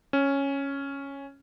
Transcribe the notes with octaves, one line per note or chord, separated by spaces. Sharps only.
C#4